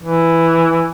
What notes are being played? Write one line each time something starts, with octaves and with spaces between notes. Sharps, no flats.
E3